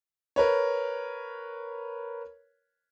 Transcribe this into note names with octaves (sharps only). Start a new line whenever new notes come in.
A#4 B4 C#5